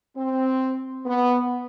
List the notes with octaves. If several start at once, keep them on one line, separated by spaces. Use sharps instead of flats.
C4
B3